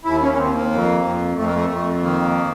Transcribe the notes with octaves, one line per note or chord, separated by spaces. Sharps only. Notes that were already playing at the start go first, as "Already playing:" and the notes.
D#2 E4
C#4
C#4
D#2 C4
A#3
F2
F2
F2 A3
A#3
A3
F2
D#3 A#3